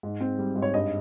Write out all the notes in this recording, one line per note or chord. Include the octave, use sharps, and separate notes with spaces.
G#2
C4
G3
G#2
C#5
G2 D#5